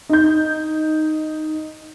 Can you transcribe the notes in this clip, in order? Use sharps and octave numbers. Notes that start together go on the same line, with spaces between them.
D#4 G6